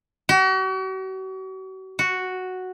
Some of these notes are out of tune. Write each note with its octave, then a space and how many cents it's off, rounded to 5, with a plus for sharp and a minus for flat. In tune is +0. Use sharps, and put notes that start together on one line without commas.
F#4 +40
F#4 +0